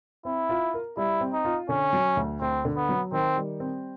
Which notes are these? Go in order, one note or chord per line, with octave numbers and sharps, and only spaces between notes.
C4 E4
F4
A#4
G3 E4
C4
D#4
F4
D3 C#4
F#3
D2
D2 C4
D3
B3
F#3
D#3 C4
G3
C4